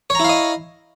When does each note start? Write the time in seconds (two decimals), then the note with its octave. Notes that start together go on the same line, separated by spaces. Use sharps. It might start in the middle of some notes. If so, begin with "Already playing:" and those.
0.10 C#5
0.15 A#5
0.20 E4
0.24 F5
0.29 D#5